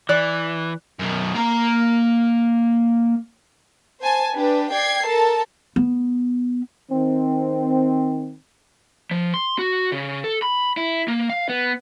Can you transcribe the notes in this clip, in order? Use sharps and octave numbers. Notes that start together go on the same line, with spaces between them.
E3 D5 F#6
F#2 B2
A#3 A#5
C5 G#5 A5
D4 G4 B4
D5 G5 G#6 C7
A4 A#4 A5
B3
D#3 C4
F3
C6
F#4
C#3
A4
B5
E4
A#3
F5
B3